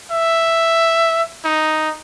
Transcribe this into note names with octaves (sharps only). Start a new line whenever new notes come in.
E5
D#4